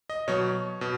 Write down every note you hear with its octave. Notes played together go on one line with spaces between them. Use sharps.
D#5
B2 F#3 C#5
B2